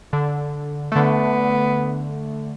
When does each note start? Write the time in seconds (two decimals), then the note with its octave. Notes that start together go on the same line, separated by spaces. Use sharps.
0.13 D3
0.92 D3 A3 B3